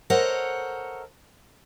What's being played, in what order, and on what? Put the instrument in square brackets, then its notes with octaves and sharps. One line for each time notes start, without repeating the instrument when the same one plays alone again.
[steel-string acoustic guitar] A4 A#4 C5 C#5 D#5 F#5